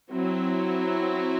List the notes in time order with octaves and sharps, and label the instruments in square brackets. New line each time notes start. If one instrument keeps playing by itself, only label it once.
[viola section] F#3 C4 E4